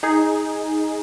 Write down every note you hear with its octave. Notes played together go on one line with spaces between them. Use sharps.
D#4 G#4